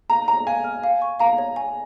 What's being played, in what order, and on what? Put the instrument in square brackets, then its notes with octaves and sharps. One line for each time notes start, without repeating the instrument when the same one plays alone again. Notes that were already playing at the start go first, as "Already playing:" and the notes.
[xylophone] F5 [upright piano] A#5
[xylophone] C#5 [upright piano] A#5
[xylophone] F5 [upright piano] G#5
[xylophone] F6
F5
C#6
[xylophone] F5 [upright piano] A#5
[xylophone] C#5
G#5